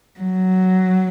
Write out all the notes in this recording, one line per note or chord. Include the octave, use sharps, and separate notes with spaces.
F#3